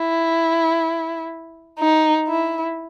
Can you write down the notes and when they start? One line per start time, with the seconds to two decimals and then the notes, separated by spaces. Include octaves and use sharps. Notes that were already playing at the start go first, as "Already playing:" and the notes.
Already playing: E4
1.79 D#4
2.28 E4